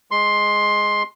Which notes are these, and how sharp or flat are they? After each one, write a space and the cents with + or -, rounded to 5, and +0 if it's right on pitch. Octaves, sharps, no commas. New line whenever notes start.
G#3 +0 C6 +10